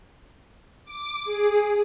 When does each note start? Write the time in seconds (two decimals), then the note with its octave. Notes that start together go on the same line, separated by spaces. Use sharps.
0.84 D6
1.25 G#4